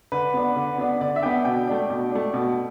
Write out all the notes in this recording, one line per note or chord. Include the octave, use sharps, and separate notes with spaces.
D3 B4
B3 D4
D3
B3 D4
D3 D5
E5
B3 D4 G5
B2 G5
A3 D4
B2
A3 D4
B2